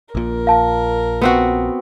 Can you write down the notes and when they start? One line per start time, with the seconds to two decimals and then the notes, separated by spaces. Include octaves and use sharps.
0.15 A#1 A#2 A#4
0.47 F5 A5
1.22 B3 C4 F#4